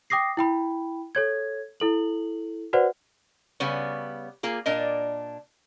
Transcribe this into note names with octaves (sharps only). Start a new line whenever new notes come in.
G5 D6 D#6 A#6 C7
E4 G5 B5
A4 C#5 G#6
E4 A4 F#7
F#4 B4 C5 D5 F#5
C#3 G3 B3 C#4
A#3 F4 G#4
A#2 D4 A#4 D#5